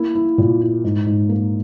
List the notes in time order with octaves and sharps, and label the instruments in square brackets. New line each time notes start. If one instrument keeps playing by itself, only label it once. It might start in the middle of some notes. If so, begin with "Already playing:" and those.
Already playing: [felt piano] A#3 E4
E4
A#2
E4
G#2
G#2
A#3